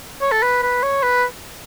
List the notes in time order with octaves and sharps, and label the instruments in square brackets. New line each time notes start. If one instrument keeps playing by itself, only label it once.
[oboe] C#5
A4
B4
B4
C#5
B4